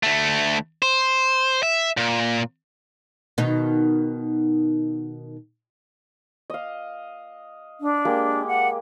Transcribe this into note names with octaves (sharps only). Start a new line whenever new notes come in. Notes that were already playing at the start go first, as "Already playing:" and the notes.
D2 A3
C5
E5
A#2
B2 D#3 D#4
D#5 F5
D4
G#3 A#3 G4
F#5